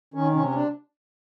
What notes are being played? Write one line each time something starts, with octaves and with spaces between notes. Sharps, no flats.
D#3 C#4
C3 C#4
C#4
D4